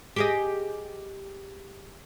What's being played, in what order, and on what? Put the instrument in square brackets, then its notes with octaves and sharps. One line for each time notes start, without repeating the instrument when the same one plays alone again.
[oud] G4 G#4 D#5